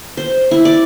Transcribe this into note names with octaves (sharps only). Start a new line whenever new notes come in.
C5
E4
D5